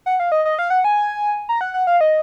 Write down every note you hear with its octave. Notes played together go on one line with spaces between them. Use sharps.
F#5
F5
D#5
D#5
F5
F#5
G#5
A#5
F#5
F#5
F5
D#5